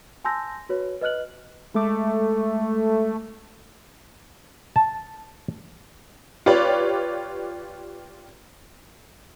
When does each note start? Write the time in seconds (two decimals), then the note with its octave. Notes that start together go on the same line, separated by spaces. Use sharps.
0.24 G#5 A5 C6 E6 G6 A#6
0.69 F#4 B4 C#5
1.01 B4 D#5 F6 F#6 F#7
1.74 G#3 A3 D6
4.76 A5
6.46 F4 G4 B4 C#5 D5